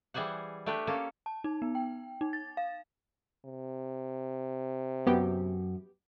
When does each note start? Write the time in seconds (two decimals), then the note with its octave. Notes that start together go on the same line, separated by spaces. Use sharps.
0.14 E3 G3 G#4 C5 F#5
0.66 A3 D4 G4 B4
0.87 A#3 C#4 A4
1.26 A5
1.44 D#4
1.62 B3
1.75 G5
2.21 D#4
2.33 A6
2.57 F5
3.45 C3
5.07 F#2 B3 G4